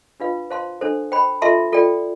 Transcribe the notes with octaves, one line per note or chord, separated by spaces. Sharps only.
D4 F4 B4 F5
C5 F5 A5 C6
D4 A4 C5
C5 G5 B5
F4 A4 E5 A5 C6
F4 A4 D5 G5